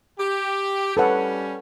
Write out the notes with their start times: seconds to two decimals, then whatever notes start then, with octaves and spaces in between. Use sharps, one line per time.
0.19 G4
0.97 G3 C#4 A4 B4 F#5